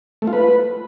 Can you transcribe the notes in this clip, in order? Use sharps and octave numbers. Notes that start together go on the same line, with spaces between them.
A3
F4
B4